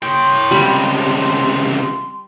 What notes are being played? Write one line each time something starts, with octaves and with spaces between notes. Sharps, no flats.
C#5 G5 C6
C#2 C3 G3